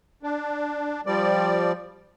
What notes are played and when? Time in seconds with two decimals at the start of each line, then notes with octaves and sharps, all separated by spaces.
0.23 D4
1.06 F3 G3 D5